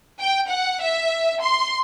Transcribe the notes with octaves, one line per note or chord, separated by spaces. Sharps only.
G5
F#5
E5
C6